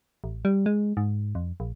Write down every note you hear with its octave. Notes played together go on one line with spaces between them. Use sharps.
A1
G3
G#3
G#2
F2
A#1